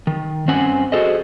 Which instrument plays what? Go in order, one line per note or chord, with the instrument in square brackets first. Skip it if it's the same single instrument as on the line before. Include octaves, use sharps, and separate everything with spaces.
[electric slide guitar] D#3
G2 C4 C#4 F#5 G#5
F#4 G#4 A4 C5 D#5